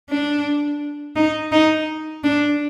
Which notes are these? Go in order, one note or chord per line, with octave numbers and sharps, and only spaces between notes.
D4
D#4
D#4
D4